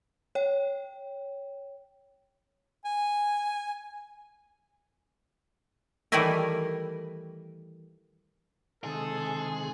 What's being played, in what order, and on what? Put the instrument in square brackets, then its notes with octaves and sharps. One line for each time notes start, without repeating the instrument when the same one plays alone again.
[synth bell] C#5 G5
[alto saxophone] G#5
[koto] D#3 E3 G3 A3 E4 A#4
[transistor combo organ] C3 D#3 G#3 [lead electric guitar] G#4 [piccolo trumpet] A4